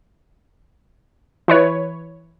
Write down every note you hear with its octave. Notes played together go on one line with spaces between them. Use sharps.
E3 B4 C#5